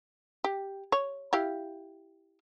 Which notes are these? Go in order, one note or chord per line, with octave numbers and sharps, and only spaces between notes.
G4
C#5
E4 G4 F5